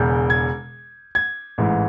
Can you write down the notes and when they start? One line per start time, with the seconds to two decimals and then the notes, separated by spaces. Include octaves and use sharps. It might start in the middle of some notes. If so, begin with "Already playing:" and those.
Already playing: E1 E2 C#3 G6
0.30 G#6
1.15 G#6
1.58 A1 G#2 E3